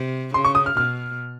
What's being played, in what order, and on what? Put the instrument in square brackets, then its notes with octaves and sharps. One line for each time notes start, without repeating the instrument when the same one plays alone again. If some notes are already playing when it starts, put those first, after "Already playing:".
Already playing: [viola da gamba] C3
[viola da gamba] C#3 [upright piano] C6
[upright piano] C#6
D#6
F6
[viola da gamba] B2 [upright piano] F6